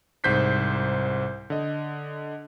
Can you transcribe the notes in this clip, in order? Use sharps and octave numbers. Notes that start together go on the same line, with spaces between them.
C2 G#2 C5 G6 B6 C7
D3 D#5